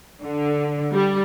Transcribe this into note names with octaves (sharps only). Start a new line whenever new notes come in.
D3
G3